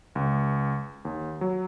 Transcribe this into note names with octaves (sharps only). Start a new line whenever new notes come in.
C#2
D#2
F#3